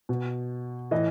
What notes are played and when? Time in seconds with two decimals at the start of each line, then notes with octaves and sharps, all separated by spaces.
0.09 B2
0.91 A2 E3 D#5